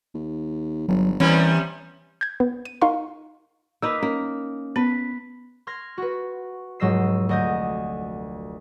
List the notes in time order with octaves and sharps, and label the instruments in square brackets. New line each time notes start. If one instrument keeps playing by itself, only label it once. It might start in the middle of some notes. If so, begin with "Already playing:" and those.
[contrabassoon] D#2
[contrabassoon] G1 [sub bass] F#3
[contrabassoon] C2 [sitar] C3 G3 B3 [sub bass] E3 [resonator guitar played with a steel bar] C#4
[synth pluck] G6 G#6
B3
D#7
D#4 A#4 F5 C6 C#6
[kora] A#3 D#4 B4 [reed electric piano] E6
[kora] A#3 [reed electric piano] C#4
[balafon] B3 [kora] B4
[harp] C6 F6 G#6 A#6
F#4 B4
F1 G#2 F#3 D#5 E6 C7
D2 D#5 G6